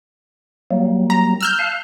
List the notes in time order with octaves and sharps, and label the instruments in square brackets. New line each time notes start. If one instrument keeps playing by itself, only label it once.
[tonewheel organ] F#3 G3 A#3
[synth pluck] A#5
E6 F6 G6
[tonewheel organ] F5 A5 F#6